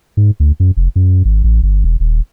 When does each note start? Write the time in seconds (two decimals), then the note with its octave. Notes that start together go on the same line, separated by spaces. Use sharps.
0.17 G#2
0.40 D2
0.60 F#2
0.77 F1
0.96 F#2
1.25 G#1
1.44 A1
1.63 G1
1.84 E1
2.00 D#1